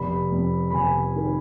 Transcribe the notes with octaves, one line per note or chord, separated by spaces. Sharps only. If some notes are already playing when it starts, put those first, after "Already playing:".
Already playing: F1 B5
F2
B5
F1 G#5
D#3